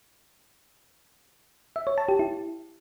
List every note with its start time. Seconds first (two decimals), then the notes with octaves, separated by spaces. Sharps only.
1.76 E5
1.87 C#5
1.98 A5
2.09 G4
2.19 E4